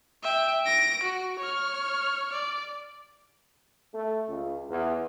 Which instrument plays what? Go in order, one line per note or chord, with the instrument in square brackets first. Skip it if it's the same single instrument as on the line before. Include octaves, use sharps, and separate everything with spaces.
[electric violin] E5 G5
A#6 D7
F#4
C#5 F6
D5
[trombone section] A3
C#2
E2